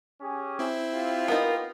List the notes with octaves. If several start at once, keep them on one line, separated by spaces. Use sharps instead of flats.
C#4 G4 G#4
C4 E4
F4 G4
B3 D#4 A#4